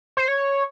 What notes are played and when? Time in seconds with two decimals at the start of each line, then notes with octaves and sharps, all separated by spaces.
0.17 C5
0.28 C#5